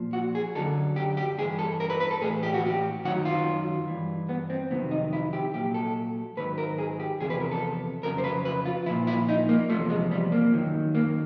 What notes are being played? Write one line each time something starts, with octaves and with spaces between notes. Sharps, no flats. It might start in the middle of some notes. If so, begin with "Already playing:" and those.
Already playing: A#2 F3
F#4
G#4
F#2 D3 F#3 A4
G4
G4
G2 E3 G#4
A4
A#4
B4
B4
A4
A2 E3 G#4
G4
F#4
G4
F#2 D#3 F#3 F#4
F4
G2 E3
B3
C4
F2 C3 D#3 F#3 B3
D#4
E4
G4
A#2 F#3 G4
A4
G#2 D#3 F#3 B4
A#4
G#4
G4
E2 C3 F3 G#4
B4
A#4
A4
F2 C#3 F#3 A#4
C5
B4
B4
F4
A#2 F3 E4
E4
D#4
A#3
E2 C3 F3 A3
G#3
G3
A#3
F#2 D#3 F#3
A#3